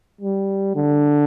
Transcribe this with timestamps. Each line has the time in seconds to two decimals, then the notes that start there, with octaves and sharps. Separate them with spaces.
0.21 G3
0.76 D3